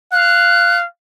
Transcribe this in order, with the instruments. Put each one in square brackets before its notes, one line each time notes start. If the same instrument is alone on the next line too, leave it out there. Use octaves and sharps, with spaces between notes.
[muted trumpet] F5 [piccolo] F#6